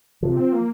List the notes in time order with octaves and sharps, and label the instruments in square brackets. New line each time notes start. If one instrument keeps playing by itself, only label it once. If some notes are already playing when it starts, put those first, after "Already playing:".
[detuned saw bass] C3 [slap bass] F3
[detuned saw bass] C4
A#3